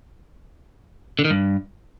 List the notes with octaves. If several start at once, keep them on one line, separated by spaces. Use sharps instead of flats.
D3
D#3
G2